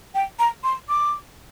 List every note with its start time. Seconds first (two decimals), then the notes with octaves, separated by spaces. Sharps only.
0.15 G5
0.39 A#5
0.64 C6
0.89 D6